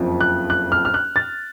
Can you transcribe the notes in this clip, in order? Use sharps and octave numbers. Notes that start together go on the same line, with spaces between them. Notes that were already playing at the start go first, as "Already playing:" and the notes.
Already playing: F#1 F2 F3
F#6
F#6
F6
F6
F#6
A6